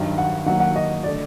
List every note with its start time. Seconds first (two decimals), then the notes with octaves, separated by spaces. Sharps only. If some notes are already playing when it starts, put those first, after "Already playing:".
Already playing: G2 D#3 F#3
0.18 F#5
0.46 D#3 F#3 A#3 F#5
0.60 F#5
0.76 D#5
1.04 D3 A3 D5